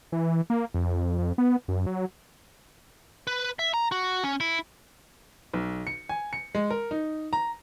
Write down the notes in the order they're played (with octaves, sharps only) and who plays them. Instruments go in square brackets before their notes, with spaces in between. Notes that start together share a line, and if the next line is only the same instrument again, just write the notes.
[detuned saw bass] E3
A#3
F2
F2
B3
F#2
F#3
[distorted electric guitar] B4
E5
A#5
F#4
C#4
E4
[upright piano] B1
C#7
G#5
C#7
G#3
A#4
D#4
A#5